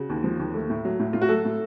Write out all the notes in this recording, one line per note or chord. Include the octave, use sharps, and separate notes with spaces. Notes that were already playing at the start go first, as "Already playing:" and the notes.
Already playing: C#3 F#4
D#2
F3
D#2
A3
A2
F#3
A2
A2 F4
F#4
F#3 A4
A2